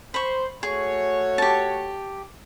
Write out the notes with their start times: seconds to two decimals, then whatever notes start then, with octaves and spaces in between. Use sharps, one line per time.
0.14 C5 B5 C#6
0.63 A3 F#4 G#4 C#5
1.38 G4 A5